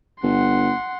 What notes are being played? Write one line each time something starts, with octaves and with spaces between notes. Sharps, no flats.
G1 F#5 C6